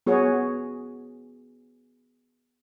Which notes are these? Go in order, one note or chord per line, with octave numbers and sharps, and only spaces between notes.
B3 F#4 G#4 C#5